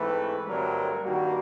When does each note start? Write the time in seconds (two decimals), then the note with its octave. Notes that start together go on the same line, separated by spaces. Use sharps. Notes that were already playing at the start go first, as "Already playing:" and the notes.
Already playing: G#2 E3 A3 C4 B4
0.46 G2 D3 F#3 A3 C4 A#4
1.04 G2 D#3 G3 A#3 F#4